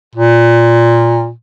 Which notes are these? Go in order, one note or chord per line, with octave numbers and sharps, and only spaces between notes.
A#2